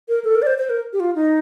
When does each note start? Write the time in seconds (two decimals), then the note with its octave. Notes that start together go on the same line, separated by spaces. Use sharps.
0.09 A#4
0.24 A4
0.35 A#4
0.42 D5
0.47 C5
0.58 C5
0.70 A#4
0.93 G4
1.00 F4
1.15 D#4